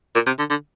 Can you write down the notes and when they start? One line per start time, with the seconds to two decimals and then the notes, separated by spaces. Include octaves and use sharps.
0.15 A#2
0.26 C3
0.39 D3
0.50 D3